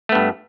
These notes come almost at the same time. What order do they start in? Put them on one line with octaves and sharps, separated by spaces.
A3 B3 G2